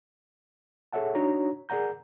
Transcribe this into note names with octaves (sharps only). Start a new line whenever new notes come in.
G#4 A4 C#5 E5 F#5 A5
D4 D#4 F#4 C#5 A#5
G#4 A#4 D5 F#5 A#5 G6